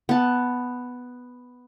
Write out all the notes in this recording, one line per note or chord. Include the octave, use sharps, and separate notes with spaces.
B3 A5